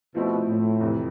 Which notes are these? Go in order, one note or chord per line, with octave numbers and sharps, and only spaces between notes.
B2 F3 A3 C4 E4
A2
F2 C3 E3